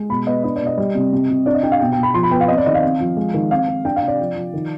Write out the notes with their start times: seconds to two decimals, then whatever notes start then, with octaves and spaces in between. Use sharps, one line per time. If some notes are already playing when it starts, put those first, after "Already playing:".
Already playing: G#3
0.09 B2 B5
0.27 B3 D#5
0.44 D4 D#5
0.56 D5
0.61 B2
0.67 D#5
0.77 G3
0.95 C3
1.12 C3
1.30 C3
1.46 D4 D5
1.55 D#5
1.63 D4 G5
1.72 F5
1.81 B2 G5
1.92 G5
1.98 B2
2.03 B5
2.14 F3 C6
2.23 B5
2.31 B3 G5
2.41 F5
2.48 C4 D#5
2.57 D5
2.66 D#3 D#5
2.74 F5
2.83 C4
3.00 F3
3.17 G#3
3.34 D#3
3.51 C4 F5
3.68 C4
3.85 D4 G5
3.96 F5
4.02 C3
4.08 D5
4.19 F3
4.36 F3
4.53 D#3